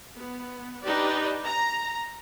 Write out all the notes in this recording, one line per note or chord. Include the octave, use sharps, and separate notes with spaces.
B3
D4 D#4 G4 B4 D5
A#5